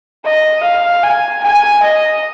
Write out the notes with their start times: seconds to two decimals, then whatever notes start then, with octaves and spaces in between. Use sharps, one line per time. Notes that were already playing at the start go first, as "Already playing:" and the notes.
0.24 D#5
0.63 F5
1.03 G#5
1.43 G#5
1.83 D#5